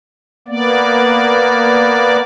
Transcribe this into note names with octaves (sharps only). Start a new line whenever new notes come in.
A#3 B3 D5